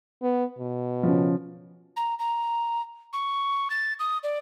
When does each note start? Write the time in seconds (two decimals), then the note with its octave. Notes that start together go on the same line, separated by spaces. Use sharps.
0.22 B3
0.59 B2
1.03 C#3 F3
1.97 A#5
2.19 A#5
3.13 C#6
3.70 A6
3.99 D#6
4.23 D5